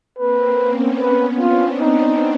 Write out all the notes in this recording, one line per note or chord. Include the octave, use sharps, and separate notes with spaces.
A#3 C4 B4
B3 C#4
B4
C4 D4 F4
D#4